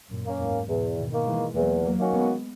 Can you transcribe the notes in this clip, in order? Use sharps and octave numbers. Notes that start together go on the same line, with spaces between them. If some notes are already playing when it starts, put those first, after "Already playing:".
F#2 A#2
A#3 C#4
E2 G#2
E2 G#2 B2
B2 D#3
D#3 A#3
E3 G#3
E2 F#3 A#3
F#3 A#3
D#3 A#3 C#4 F#4
G#3 B3